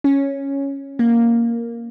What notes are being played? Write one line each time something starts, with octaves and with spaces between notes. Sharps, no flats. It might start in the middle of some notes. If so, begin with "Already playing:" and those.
C#4
A#3